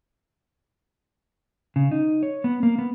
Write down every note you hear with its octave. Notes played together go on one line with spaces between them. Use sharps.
C#3
D#4
C#5
B3
A#3
B3